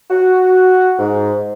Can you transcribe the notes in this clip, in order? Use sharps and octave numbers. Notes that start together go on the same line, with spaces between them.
F#4
G#2